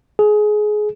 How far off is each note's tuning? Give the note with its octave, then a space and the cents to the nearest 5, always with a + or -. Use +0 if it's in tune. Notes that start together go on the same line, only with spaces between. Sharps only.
G#4 +20